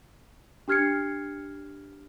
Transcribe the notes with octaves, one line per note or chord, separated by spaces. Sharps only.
D4 G4 F6 G#6 C7 C#7